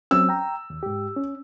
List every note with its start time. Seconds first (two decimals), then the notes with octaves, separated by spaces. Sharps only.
0.11 F#3 C4 C#4 E6
0.29 G5 A#5
0.70 D#2
0.83 G#2 G4
1.16 C#4